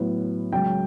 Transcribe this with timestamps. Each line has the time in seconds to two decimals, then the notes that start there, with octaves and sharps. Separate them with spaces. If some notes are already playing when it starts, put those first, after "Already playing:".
Already playing: A2 F#3 B3
0.52 C#2 C#3 F#3 G5